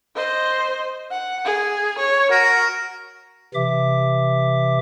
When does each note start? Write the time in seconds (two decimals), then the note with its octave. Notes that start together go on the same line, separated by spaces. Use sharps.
0.16 C5 D#5
1.11 F#5
1.45 G#4
1.98 C#5
2.31 F#4 A#4
3.55 C3 E3 E5 D6